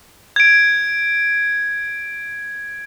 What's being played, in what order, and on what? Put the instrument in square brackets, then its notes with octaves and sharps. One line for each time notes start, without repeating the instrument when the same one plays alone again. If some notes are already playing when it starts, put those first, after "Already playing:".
[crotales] G#6 D7